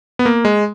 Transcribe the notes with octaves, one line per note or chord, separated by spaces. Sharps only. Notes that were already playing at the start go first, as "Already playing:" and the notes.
B3
A#3
G#3